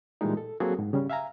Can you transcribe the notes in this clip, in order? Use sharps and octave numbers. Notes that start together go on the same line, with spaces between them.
A#2 E3 G3 G#3 D#4
A4
F#3 A#3 C4 F#4 G#4 A4
G#2
C#3 G3 C#4
E5 F5 G#5 A#5